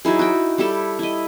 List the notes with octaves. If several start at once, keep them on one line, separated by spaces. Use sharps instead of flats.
F#3 D#4 E4 G#4
F#4 G5
G3 E4 G4 A4
E4 D#5